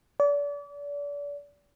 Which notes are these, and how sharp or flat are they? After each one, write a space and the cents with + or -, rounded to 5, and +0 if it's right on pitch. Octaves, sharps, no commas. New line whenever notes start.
D5 -35